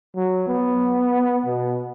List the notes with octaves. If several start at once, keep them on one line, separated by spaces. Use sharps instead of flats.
F#3
B3
B2